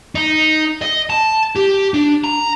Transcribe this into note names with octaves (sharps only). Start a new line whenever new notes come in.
D#4
D#5
A5
G4
D4
A#5